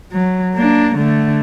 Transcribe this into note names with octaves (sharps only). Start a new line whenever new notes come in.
F#3
A#3 D4
D3 A3